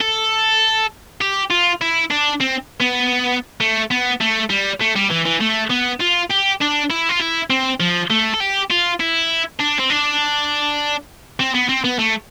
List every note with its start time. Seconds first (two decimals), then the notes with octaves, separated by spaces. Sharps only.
0.01 A4
1.21 G4
1.51 F4
1.82 E4
2.10 D4
2.40 C4
2.80 B3
3.61 A3
3.91 B3
4.21 A3
4.50 G3
4.81 A3
4.96 G3
5.10 E3
5.25 E3
5.40 A3
5.70 B3
6.00 F4
6.30 G4
6.61 D4
6.90 E4
7.09 F4
7.20 E4
7.50 C4
7.80 F3
8.10 A3
8.34 A4
8.40 G4
8.70 F4
9.00 E4
9.60 D4
9.79 C4
9.90 D4
11.40 C4
11.54 B3
11.69 C4
11.84 B3
11.99 A3